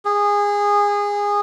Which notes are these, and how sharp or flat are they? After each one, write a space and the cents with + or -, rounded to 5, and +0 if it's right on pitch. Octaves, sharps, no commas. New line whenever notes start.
G#4 -20